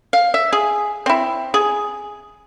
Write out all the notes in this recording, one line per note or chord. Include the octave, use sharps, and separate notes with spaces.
F5
E5
G#4
C4 E4
G#4